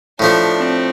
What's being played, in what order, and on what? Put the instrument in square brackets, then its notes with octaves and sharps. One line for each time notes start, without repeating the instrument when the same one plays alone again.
[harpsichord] A2 F3 A3 [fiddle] D4
[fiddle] C4